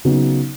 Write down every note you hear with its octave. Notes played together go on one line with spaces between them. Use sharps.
C#3 F#3 B3 D#4